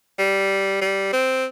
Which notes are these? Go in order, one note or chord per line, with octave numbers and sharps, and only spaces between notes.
G3
G3
C4